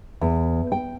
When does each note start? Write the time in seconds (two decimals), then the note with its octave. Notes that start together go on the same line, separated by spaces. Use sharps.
0.21 E2
0.72 G5